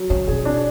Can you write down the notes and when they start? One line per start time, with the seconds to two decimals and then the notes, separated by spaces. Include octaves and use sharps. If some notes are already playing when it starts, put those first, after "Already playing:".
Already playing: F#3
0.10 C#3 C#4
0.27 B2 G#4
0.45 D4